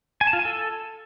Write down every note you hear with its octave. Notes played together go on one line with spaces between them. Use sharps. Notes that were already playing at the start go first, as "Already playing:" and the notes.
G#5
A5
F4
G#5
A4